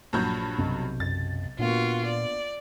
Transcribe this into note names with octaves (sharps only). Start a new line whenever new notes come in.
A#1 G2 F3 F#3 G6
B1 C3
F#2 A6
A#2 A#3 B3 D4 F4 F#4
D5